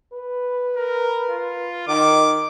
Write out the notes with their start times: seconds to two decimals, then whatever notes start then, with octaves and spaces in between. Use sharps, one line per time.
0.13 B4
0.76 A#4
1.30 F4
1.88 D#3 D6